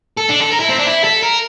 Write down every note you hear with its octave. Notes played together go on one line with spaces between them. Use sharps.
A4
D4
A4
A#4
E4
C4
D4
E4
A4
A#4